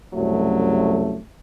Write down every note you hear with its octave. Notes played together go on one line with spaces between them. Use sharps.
C2 F#2 C#3 F#3 A3